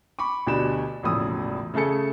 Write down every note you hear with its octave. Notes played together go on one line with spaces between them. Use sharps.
B5 C#6 D6
D2 B2 D4 G4 B5 E7
E1 A#1 A2 C#3 D#6 E6
C#3 A3 G#4 A4 C#7